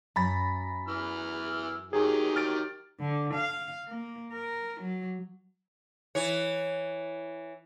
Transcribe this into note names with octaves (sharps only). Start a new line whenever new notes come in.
F#2 A#5 B5 A6
E3 E6 F6
D#3 F#3 G4 G#4
F6 A6 D7
D3
F5
A#3
A#4
F#3
E3 C#5